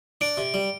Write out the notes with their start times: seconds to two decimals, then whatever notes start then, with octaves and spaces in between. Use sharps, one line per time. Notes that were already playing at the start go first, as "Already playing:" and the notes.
0.21 D4 D7
0.37 C3
0.54 G3